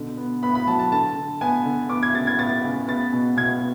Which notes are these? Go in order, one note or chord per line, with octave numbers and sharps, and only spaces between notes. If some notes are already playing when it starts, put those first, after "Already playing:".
Already playing: B2 D3
B3
B3 B5
B5
F#3 A5
A5
D3 A5
D3
B3 G#5
D3
B3 D6
G#6
C#3 A6
G#6
B3 A6
C#3
B3 A6
B2
B2 G#6